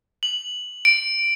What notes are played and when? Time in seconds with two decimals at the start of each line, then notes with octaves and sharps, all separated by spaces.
0.23 F#7
0.85 D7